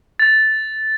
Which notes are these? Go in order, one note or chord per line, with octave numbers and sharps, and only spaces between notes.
A6